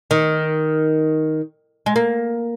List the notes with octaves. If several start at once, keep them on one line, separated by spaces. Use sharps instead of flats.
D#3
G#3
A#3